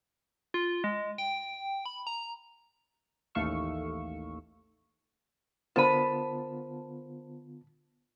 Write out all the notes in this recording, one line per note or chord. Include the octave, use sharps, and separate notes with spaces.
F4
G#3
G5
B5
A#5
A1 D#2 A3 F5 C#6 E6
D3 B3 F4 A#4 C5 A5 B5 D#7